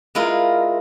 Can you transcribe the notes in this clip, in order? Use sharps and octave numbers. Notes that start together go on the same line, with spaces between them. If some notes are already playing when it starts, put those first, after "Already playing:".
G#3 E4 F4 A#4